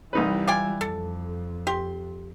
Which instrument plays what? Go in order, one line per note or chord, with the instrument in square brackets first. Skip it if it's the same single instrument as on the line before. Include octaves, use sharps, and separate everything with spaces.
[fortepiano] C2 D#4 B4 [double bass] E3 G3
[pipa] F4 G5 G#5 [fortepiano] D6
[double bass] F2 [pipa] A4
[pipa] G4 [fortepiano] C6